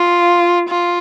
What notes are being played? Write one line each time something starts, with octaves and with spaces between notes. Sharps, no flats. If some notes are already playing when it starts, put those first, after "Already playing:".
Already playing: F4
F4